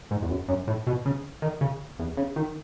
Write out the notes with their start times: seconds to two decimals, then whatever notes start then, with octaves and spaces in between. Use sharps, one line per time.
0.11 G#2
0.22 E2
0.30 F#2
0.48 F#2
0.67 A2
0.87 B2
1.06 C#3
1.42 D#3
1.61 C#3
1.99 E2
2.17 C#3
2.36 D#3